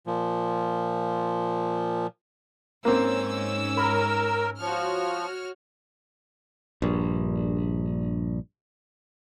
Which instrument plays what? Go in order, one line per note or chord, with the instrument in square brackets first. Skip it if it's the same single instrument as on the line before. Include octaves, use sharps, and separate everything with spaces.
[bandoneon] A#2 F3
[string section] G#2 C#4 E6 [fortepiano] A#3 C4
[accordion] A#4 [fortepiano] B5
[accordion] F3 [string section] F#4 C#5 F6
[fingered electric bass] A#1 G2